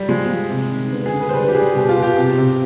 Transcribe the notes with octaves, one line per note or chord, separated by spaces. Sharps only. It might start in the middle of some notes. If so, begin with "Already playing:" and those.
Already playing: G3
F3 G#3
F3
C3
D#3
D3 B3
G#4
D3
B4
C5
G3 B4
G4
G3 G#4
B2 G4
F4
B2
G4
C3
C3